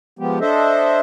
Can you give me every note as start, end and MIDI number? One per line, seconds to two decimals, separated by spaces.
0.19 0.39 53
0.19 0.39 56
0.19 0.39 59
0.19 0.39 67
0.41 1.01 62
0.41 1.01 69
0.41 1.01 72
0.41 1.01 75
0.41 1.01 76